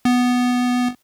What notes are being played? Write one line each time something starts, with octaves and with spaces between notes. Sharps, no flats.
B3